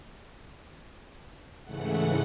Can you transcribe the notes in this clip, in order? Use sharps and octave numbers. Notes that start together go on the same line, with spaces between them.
G#2 C#3 E3 A3 F#5